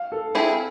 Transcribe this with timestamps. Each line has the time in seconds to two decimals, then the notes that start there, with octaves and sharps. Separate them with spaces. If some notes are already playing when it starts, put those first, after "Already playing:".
Already playing: F5
0.12 A4
0.35 C4 E4 G#4